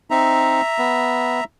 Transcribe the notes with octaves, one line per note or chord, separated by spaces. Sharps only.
C4 D#4 E5 A#5
B3